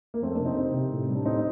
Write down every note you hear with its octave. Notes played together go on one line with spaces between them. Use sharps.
A#3
F2 A3 C4
A#3 D4
C3
C4 D#4
C3
C3
A2
G3
D4
A2 C4 D#4